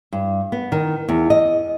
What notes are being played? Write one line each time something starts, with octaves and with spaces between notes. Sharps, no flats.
G2
B3
D#3
E2
D#5